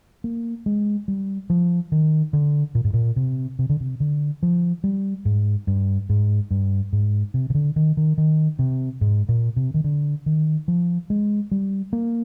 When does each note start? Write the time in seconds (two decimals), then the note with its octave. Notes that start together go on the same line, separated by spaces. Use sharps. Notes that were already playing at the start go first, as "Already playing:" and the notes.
0.24 A#3
0.66 G#3
1.08 G3
1.50 F3
1.92 D#3
2.33 D3
2.75 A#2
2.84 G#2
2.94 A#2
3.16 C3
3.59 C3
3.69 D3
3.80 C3
4.00 D3
4.43 F3
4.84 G3
5.25 G#2
5.67 G2
6.09 G#2
6.51 G2
6.93 G#2
7.34 C3
7.50 C3
7.55 D3
7.76 D#3
7.97 D#3
8.18 D#3
8.59 C3
9.01 G#2
9.29 A#2
9.56 C3
9.74 D#3
9.84 D3
10.26 D#3
10.68 F3
11.10 G#3
11.51 G3
11.93 A#3